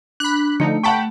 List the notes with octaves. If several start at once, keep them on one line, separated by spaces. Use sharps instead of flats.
D4 B5 F#6
D3 F3 A3 D#4
F#5 G5 A5 B5 C#6